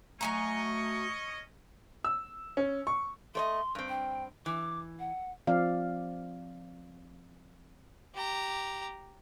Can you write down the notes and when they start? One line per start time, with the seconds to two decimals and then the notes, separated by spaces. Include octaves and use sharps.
0.21 F#3 A3 C#4 D#5 G#5 A#5 C#6
2.04 E6
2.57 C#4
2.87 C#6
3.35 A3 C#5 D#5 C6
3.75 G2 C4
3.89 G5
4.46 E3 D6
4.99 F#5
5.47 F3 C4 D5 F5
8.15 G4 A#5